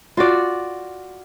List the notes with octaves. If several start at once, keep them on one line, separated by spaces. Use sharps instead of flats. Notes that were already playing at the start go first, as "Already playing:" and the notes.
F4 F#4 D5